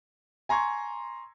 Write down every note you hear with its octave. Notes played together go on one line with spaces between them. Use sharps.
G#5 A#5 C6 C#6 G#6